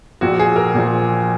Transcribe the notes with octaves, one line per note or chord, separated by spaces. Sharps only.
A#1 A#2 F3 F#4
G#4
A#4
A#1 A#2 F3